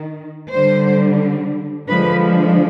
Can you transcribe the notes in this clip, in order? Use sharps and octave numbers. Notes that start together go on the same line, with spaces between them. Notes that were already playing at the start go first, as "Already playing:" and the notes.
Already playing: D#3
D3 G3 C5
D3 F3 G#3 B4